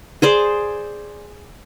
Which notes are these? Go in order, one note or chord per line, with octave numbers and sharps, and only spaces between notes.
G#4 C5 D5